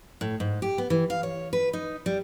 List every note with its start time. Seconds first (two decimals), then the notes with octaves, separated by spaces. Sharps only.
0.21 A2
0.40 G#2
0.62 G4
0.78 B3
0.90 E3
1.10 F5
1.23 C#5
1.53 B4
1.73 D#4
2.06 G3